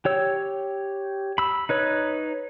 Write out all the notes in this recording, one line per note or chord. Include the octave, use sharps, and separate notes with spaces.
G4 C#5 E6
B5 E6
D#4 B4 C#5